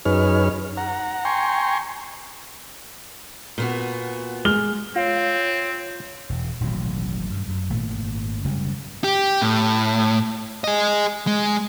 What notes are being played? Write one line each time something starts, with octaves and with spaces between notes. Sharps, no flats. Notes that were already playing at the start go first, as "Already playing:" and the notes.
F#2 D#4 G#4 B4 C#5 F6
F#5 A#5
G5 G#5 A#5 C6 C#6
A#2 B3 F#4
G#3 F6 G7
C4 F4 C#5
E1
D#1 A1 B2 F#3
G2
F#2
G#1 A#2 A3
F#1 C#3 G3 G#3
G4
A2
G#4 D#5
G#3